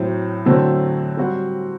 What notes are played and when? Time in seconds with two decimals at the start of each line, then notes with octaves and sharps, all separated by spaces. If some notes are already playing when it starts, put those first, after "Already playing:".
Already playing: A2 F#3 C4
0.45 D3 F#3 A3 C4 E4
1.17 G3 C4 F#4 C5